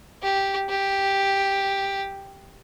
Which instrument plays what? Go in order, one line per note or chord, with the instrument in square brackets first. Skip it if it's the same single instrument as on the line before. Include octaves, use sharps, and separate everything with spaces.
[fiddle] G4
G4